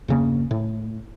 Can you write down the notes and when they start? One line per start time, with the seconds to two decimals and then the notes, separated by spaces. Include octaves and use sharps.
0.08 E2 G2 C#3 A#3
0.51 A2